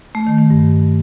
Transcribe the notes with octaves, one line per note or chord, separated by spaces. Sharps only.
A3
D#3
A3
G2